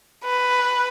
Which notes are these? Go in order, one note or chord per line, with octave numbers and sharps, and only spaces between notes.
B4